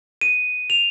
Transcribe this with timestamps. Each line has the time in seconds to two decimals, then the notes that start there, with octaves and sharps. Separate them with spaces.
0.21 D#7
0.70 F7